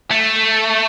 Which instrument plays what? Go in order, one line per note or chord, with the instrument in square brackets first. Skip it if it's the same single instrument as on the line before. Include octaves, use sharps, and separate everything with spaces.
[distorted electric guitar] A3